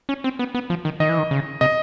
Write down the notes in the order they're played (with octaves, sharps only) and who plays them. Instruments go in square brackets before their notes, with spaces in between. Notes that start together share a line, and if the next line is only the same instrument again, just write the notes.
[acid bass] C#4
C4
B3
B3
F3
D#3
[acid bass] D#3 [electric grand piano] D#5
[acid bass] E3
D#3
C#3
[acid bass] C3 [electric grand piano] D#5